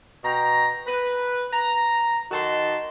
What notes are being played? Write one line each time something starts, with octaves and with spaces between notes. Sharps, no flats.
B2 G5 A#5
B4
A#5
D#3 D#4 F#4 A5 C6